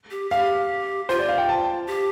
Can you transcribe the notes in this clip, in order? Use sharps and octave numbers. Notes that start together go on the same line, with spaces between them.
G4
G4 F5
F4 C5
D5
F5
G5
A5
G4